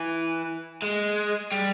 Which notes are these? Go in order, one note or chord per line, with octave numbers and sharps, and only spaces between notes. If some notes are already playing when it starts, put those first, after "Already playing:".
Already playing: E3
G#3
G3